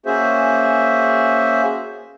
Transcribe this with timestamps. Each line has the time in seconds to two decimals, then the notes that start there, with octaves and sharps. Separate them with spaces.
0.06 A#3 C#4 F#4 G#4 C5 E5